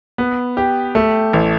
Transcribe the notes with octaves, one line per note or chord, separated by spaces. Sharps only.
B3
G4
A3
A1